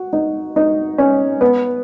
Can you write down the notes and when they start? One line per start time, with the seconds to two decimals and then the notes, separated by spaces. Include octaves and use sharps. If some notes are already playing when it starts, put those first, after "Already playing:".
Already playing: F#4
0.13 D#4
0.56 D#4
0.98 C#4
1.41 B3